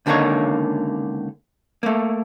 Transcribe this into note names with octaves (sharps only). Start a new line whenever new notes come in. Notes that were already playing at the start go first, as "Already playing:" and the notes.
C#2 D3 D#3 A#3 A#4 C#5
A3 A#3